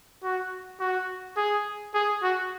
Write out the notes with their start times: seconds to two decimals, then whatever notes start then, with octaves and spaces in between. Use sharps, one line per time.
0.23 F#4
0.80 F#4
1.37 G#4
1.94 G#4
2.23 F#4